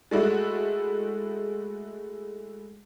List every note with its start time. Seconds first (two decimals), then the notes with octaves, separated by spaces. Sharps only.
0.11 G#3 A3 E4 F#4